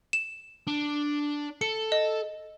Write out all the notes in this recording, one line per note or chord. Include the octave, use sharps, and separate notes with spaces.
E7
D4
A4 C#7
D#5